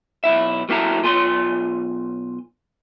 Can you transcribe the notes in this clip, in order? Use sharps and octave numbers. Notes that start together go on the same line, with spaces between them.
B1 E2 E4 E5
F#3 A#3 E4 A4 A#5
B1 F4 G#5 C6